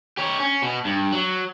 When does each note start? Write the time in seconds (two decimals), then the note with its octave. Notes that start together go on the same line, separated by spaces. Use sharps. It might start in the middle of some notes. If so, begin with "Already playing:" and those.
0.17 G4 C#5
0.40 C#4
0.62 B2
0.85 G2
1.12 F#3